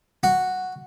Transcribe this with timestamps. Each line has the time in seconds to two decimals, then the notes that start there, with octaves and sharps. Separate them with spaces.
0.23 F#4